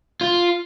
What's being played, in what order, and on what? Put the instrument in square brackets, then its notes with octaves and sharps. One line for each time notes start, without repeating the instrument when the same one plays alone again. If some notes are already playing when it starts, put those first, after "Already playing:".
[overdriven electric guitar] F4